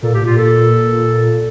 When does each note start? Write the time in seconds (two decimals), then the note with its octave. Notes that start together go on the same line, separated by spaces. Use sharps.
0.03 A#2 A4
0.13 A2 G4
0.23 A#2 F4
0.37 A4